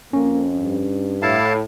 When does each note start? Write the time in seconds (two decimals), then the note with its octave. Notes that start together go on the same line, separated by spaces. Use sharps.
0.13 F2 A#3 C#4
0.58 G2
1.22 A2 E4 F5 A5